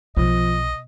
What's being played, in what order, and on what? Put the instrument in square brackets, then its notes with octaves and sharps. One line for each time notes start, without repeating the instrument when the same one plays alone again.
[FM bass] B1 [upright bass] B2 [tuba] F3 [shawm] D#5